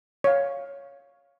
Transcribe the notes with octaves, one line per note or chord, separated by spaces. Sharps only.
C#5 F5